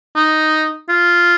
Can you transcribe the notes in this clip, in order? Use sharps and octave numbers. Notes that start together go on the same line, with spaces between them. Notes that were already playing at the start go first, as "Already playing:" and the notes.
D#4
F4